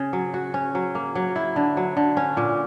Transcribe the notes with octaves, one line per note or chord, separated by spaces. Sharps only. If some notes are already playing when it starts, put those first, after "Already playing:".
Already playing: C#3
F#3
F#4
C#4
F#3
A#3
F#3
E4
D3
F#3
D3
C#4
A#2